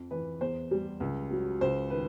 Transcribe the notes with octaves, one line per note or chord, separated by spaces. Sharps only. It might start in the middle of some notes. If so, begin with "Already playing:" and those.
Already playing: F2
E3 B4
E2 C5
G3
C#2
F#3
C#2 C5
D#3 B4